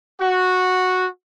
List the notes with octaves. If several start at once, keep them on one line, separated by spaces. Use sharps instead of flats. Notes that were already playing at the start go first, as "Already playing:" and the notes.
F#4